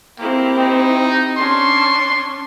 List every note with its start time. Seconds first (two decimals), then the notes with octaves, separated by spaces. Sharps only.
0.18 A#3 C4 E4 G4
0.56 D#4
1.37 C#4 D4 C6 C#6